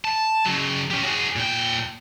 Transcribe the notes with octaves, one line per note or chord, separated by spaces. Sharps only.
A5
C#3 F#3
C#4 G4
F#4 G#4
A#2 G5